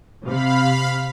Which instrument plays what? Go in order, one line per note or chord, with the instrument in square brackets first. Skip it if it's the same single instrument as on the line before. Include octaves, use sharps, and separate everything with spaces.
[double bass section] C3 [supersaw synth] F5 B5